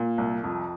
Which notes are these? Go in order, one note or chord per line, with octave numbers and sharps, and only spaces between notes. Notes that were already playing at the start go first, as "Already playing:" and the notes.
Already playing: A#2
C2
F2